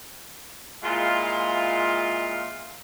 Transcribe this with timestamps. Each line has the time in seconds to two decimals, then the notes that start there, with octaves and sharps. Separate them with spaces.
0.85 A#2 G#3 E4 F4